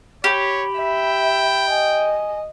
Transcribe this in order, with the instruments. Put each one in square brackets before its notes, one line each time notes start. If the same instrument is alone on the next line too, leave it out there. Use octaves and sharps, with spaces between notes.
[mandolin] G4 [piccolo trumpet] C#5 [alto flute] B5
[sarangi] E5 [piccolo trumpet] G5
[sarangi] D#5 [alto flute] G#5